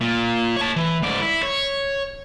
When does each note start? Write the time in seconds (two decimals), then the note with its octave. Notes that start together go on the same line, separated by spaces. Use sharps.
0.01 A#2
0.57 C#5 A5
0.76 E3
1.02 G#2 D5
1.22 E4
1.43 C#5